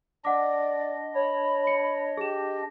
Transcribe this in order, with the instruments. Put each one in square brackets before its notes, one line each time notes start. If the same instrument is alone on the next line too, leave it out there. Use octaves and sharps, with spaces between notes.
[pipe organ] D4 D#5 [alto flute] D5 [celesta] F#5 D6
[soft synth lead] C#5 [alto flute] B5
[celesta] C#7
[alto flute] G4 [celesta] G#4 E7